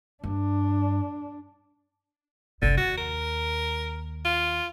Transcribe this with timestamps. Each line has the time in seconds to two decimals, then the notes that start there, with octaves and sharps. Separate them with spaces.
0.24 G2 D4
2.62 F#1 C2 D3
2.77 D#2 F#4
2.97 A#4
4.25 F4